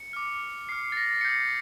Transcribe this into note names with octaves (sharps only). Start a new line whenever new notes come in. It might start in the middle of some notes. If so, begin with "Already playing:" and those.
Already playing: C#7
D6 F6
D6 F6 C7
A6
A#6
C#7
D#6 G6 C7